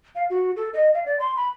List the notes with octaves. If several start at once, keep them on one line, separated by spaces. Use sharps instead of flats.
F5
F#4
A4
D#5
F5
D5
C6
B5